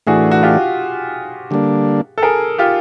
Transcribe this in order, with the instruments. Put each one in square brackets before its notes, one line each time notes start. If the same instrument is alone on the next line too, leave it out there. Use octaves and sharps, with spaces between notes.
[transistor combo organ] A2 E3 A3 D4 [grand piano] F#4 G#4
[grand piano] F#4
F4 G4
[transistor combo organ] D3 G3 A#3 D4
[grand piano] A4
G#4 A#4
F4 G4